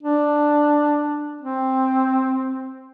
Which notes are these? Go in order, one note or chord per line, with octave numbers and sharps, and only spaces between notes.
D4
C4